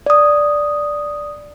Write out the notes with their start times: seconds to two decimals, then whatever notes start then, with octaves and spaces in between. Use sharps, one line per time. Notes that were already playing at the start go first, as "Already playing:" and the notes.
0.06 D5 D#6